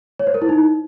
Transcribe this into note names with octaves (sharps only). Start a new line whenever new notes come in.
C#5
C5
A#4
E4
D#4